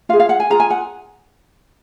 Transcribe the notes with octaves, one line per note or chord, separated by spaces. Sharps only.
F4 G#4 F5
F5
F#5
G#5
F4 G#4 A#5
G#5
F#5